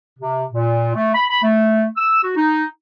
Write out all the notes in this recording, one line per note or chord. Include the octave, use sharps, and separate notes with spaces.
C3
A#2
A3
B5
B5
A3
E6
F#4
D#4